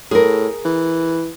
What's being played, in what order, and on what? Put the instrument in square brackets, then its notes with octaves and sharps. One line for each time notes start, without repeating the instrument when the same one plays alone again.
[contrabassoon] A2 [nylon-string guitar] G#4 A#4
[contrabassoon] E3